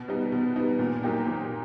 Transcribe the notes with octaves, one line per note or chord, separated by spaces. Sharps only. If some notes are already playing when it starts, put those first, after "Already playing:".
Already playing: B2
G3 B3 D#4
B2
G3 B3 D#4
A#2
F#3 A#3 D#4 G4
A#2